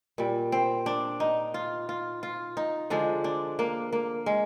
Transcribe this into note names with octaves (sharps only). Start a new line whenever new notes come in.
A#2 G3
C4
D4
D#4
F4
F4
F4
D#4
D3 F3 G#3 D4
D4
A#3
A#3
G#3